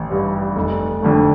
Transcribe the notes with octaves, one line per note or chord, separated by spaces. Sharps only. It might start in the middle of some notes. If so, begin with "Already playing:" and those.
Already playing: A1
G2 G3
F1
F2 D3 A3